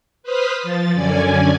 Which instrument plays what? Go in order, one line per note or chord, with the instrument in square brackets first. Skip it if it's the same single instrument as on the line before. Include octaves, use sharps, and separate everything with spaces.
[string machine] B4 C5 D#6 F6 B6
F3 A6
F#2 D3 C#4 D5 G#5 G#6